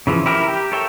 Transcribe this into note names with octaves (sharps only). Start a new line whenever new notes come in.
C#3 E3 F3
E4 G4 A#4
G4 G5
A4 A#4 C#5 E5 G5